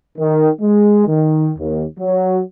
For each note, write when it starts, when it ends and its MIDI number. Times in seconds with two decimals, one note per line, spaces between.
0.18 0.48 51
0.61 1.05 56
1.07 1.49 51
1.58 1.83 39
1.99 2.40 54